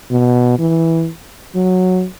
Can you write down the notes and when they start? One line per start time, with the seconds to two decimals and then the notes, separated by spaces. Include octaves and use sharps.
0.11 B2
0.59 E3
1.55 F#3